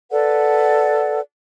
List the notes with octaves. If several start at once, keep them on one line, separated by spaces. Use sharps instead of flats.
A4 B4 D5 F#5